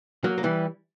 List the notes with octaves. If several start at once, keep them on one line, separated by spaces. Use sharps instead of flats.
F#3 A#3
A#3
E3 G3